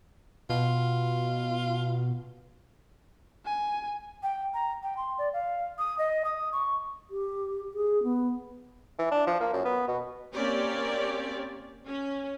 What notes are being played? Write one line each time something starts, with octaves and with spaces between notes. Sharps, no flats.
B2 F4
G#5
G5
A#5
G5
C6
D5
F5
D#6
D#5
D#6
C#6
G4
G#4
B3
E3
D4
F3
A#3
F#2
B3
B2
A#3 C4 C#4 G4 C#5 D5
C#4